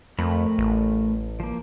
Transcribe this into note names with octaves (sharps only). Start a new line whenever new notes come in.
F2 A3 A#4 B5
A1
F3 A#3